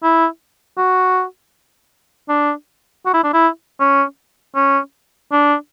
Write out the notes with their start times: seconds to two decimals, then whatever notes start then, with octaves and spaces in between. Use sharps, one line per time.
0.03 E4
0.78 F#4
2.29 D4
3.05 F#4
3.14 E4
3.23 D4
3.33 E4
3.80 C#4
4.55 C#4
5.32 D4